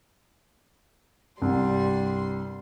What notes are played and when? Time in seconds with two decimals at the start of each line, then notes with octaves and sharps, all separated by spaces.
1.42 C2 G2 G3 C6